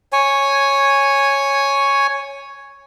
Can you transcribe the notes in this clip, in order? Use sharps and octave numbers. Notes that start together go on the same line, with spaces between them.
C#5 G#5